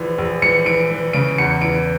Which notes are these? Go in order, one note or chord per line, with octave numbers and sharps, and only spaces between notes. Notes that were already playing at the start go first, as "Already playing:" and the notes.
Already playing: A#1 E3
A#1
E3 C#7
E3 D7
E3
C#3 D7
E2 C#7
E3 D7